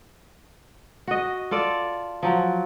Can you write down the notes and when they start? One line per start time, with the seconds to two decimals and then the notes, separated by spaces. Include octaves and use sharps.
1.07 F#4 D#5
1.51 F4 A4 D5
2.23 F3 F#3